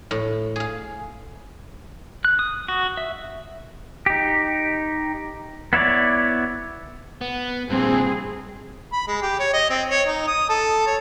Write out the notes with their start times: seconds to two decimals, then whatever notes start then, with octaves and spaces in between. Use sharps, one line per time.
0.11 A2
0.56 G#4 F5
2.25 F#6
2.39 D#6
2.68 F#4
2.97 E5
4.06 D#4 G4
5.73 B3 E4 C#5 D5
7.21 B3
7.70 G2 A#2 C4 G#4
8.93 B5
9.08 G#3
9.22 G4
9.40 C#5
9.53 D#5
9.70 C4
9.90 C#5
10.07 D#4
10.27 D#6
10.49 A4
10.87 C#5